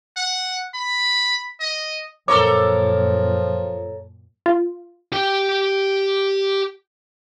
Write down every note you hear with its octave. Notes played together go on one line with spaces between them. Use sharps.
F#5
B5
D#5
F#2 A#2 F3 A4 A#4 C#5 D6
F4
G4 G5